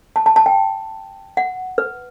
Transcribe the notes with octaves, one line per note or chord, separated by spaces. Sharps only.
A5
A5
A5
G5
F#5
B4